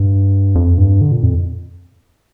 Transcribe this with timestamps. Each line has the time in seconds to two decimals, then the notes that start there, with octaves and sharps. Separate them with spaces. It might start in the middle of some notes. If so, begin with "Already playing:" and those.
Already playing: G2
0.55 F2
0.78 G2
1.01 D3
1.12 A#2
1.23 F2